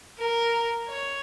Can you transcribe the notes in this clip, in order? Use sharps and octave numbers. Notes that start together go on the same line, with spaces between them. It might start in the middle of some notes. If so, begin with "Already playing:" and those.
A#4
C#5